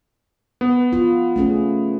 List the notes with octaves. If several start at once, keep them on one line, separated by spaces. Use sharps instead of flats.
B3
F4
A3 C#4 G#4